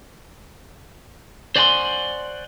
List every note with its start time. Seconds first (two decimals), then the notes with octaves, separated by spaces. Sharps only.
1.56 C5 D5 F#5 G#5 A5 C6